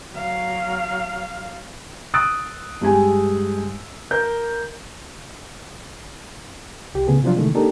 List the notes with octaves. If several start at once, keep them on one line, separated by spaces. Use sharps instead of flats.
F#3 F5
D#6 E6 F#6 A6 D7
G2 G#3 G4 G#5
A#4 G6
C2 G4
A2 C#3 B3 G#4
C3 F3 F#3 C4 D4 F4
C3 D#3 E3 G#3 A3
A#3 D4 D#4 G4 A4 A#4